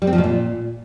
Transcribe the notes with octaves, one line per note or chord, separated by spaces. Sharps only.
G3
C4
F3
B2
A#2